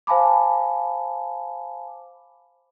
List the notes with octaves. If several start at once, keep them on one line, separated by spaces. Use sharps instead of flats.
C5 F5 G#5 A5 B5 D6